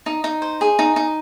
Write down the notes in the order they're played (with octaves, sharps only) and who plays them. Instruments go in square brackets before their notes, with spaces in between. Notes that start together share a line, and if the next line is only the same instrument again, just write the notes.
[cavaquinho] D#4
D#4
C5
G#4
D#4
D#4